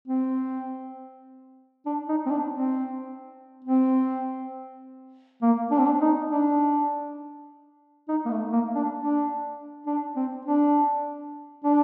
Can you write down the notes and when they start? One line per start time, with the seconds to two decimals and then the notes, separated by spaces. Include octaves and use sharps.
0.08 C4
1.86 D4
2.09 D#4
2.26 C4
2.31 D4
2.52 C4
3.65 C4
5.42 A#3
5.71 D4
5.79 C4
5.86 D4
6.01 D#4
6.31 D4
8.09 D#4
8.25 A#3
8.31 A3
8.52 A#3
8.75 D4
8.98 D4
9.86 D4
10.16 C4
10.45 D4
11.64 D4